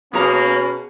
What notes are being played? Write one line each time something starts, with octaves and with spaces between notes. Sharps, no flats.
B2 A#3 C#4 G#4 A#5